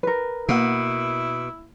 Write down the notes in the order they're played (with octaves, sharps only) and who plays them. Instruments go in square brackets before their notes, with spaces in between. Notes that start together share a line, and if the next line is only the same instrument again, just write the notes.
[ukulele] A#4 B4
[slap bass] B2 [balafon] A#3 F#5 [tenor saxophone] E4